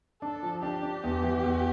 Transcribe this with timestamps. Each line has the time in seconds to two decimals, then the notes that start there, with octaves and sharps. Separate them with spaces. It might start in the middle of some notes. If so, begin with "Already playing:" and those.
0.22 D4 A4
0.43 F3
0.63 D4 G4
0.83 D4
1.03 E2
1.23 E3
1.43 E2